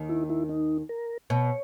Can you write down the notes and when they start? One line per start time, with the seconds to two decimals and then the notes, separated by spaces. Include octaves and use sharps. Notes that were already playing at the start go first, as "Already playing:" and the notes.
Already playing: D#2 D#3
0.09 E4
0.30 E4
0.49 D#4
0.89 A#4
1.30 B2 C#5